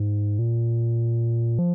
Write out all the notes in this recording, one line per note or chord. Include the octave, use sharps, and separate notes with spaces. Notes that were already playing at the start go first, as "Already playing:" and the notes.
Already playing: G#2
A#2
F3